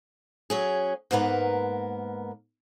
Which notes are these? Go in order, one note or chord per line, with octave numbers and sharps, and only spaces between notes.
F#3 C#4 G#4
G#2 A#3 B3 A#4 B4